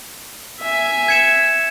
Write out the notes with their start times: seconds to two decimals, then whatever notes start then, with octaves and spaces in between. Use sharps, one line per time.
0.60 E5 G#5
1.08 G#6 C#7 E7